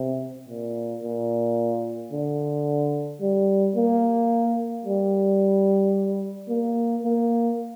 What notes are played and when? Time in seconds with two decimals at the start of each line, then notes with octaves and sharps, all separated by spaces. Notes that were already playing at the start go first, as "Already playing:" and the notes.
Already playing: C3
0.49 A#2
1.04 A#2
2.12 D3
3.21 G3
3.76 A#3
4.86 G3
6.49 A#3
7.03 A#3